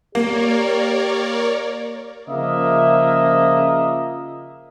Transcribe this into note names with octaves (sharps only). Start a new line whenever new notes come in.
A#3 G4 A#4 C#5 D5
C#3 F3 A#3 D#5 E5